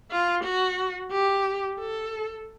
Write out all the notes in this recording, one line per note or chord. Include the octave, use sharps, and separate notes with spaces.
F4
F#4
G4
A4